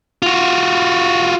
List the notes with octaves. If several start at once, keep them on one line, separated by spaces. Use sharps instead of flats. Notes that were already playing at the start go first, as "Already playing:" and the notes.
F4 F#4